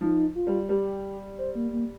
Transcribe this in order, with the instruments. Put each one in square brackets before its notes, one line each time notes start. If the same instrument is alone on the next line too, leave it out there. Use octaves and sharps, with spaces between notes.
[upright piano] F3 [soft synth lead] D#4
[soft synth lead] F4
[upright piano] G3
[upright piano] G3 [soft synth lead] G4
[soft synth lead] C5
A#3
A#3